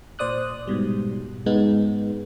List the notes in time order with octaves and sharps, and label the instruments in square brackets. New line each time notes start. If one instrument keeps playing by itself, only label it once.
[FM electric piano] A#2 C5 D5 D#6 F#6
G#2 B2 G3
G#2 G#3 B3 D#4